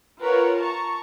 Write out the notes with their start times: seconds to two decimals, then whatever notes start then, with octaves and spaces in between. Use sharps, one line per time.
0.22 F4 A#4 B4 C#5 F#5
0.60 A5 A#5 C#6